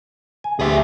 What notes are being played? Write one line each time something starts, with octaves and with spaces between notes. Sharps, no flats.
G#5
D2 G4 G#4 E5